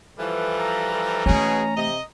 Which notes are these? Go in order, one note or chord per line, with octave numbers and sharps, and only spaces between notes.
E3 F3 G3 A4 B4
A#5
A4
B2 E3 A3 C#4 G#4
C3 D#5